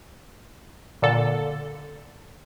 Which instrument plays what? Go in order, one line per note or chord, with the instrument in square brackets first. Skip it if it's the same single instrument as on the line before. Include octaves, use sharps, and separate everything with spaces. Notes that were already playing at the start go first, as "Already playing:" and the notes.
[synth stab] A#2 D3 A4